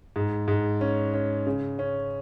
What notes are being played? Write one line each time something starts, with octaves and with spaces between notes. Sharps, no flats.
G#2
G#2
C#4
C#4
C#3
C#4